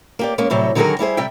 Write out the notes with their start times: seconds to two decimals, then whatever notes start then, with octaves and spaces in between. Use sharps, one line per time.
0.19 A#3 G4 D5
0.38 G#3 A#3 C#4
0.50 A2 C3 F#3 G3
0.75 D3 D#3 F#3 F#4 G#4 A#4
0.99 G3 E4 G#4 C5
1.17 C3 G3 E5 G5